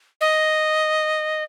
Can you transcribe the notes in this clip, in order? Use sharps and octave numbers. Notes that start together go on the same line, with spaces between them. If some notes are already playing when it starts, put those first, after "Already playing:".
D#5